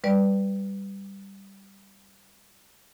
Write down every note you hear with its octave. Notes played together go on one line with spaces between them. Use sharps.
G3 B4 D5